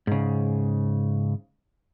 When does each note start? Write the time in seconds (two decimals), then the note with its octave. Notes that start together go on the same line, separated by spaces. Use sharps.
0.07 G#2 C#3